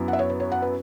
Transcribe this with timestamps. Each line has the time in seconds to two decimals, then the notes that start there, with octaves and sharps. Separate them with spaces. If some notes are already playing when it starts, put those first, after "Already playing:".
Already playing: F#2 F#3 B3 E4
0.08 F#5
0.13 E5
0.19 C#5
0.30 B4
0.40 C#5
0.52 F#5
0.62 B4